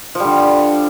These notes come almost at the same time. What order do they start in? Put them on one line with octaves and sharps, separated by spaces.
F3 G3 D3